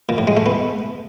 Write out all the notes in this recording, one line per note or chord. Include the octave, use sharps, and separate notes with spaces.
A#2
A2
G#3
A3
B3